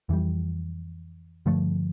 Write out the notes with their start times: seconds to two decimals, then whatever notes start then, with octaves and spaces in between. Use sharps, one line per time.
0.09 F2 E3 G3
1.46 G2 D3 F3 A3